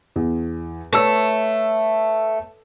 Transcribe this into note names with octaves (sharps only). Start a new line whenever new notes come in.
E2
A3 B4 C#5 E6